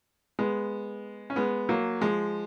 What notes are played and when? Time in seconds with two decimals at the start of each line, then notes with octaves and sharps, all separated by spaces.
0.39 G#3 B3
1.30 C#4
1.36 G#3 B3
1.69 F#3 A#3
2.01 F3 G#3